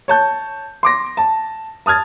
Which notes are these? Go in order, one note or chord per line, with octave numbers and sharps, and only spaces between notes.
C#5 A5 G6
C6 D6 A#6
A5
A5 D#6 F6 G#6 A6